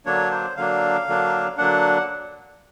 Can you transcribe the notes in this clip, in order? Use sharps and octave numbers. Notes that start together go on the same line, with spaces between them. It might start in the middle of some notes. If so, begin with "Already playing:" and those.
D3 F#3 A#3 D4 C#5
C5
D3 F#3 A#3 D4 F5
D3 F#3 A#3 D4
D3 F#3 A#3 D4 F#5